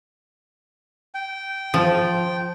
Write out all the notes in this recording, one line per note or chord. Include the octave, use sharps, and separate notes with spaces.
G5
F3